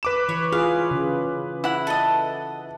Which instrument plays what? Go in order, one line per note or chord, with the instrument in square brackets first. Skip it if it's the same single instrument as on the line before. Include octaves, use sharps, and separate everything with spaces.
[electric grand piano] B4 D6 E7
[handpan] E3 [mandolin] C#5
[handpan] F4 G#4 [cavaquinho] F5
[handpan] C#3
[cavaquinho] E4 F#5
[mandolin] A4 D#5